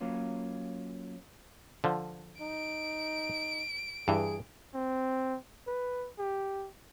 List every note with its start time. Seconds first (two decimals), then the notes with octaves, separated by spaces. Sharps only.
0.01 F#3 A#3 C#4 F4
1.84 D3 F3
2.41 D#4 D7
4.08 G2 E3 G#4
4.74 C4
5.67 B4
6.19 G4